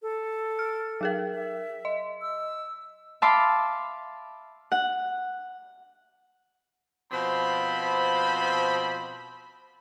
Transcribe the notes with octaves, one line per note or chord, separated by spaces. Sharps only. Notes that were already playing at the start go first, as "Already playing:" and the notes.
A4
F6
F#3 G#4 A#4
E5
D#5
E6
E5 F5 A5 B5 C6 D6
F#5
B2 F3 C4 C5 B5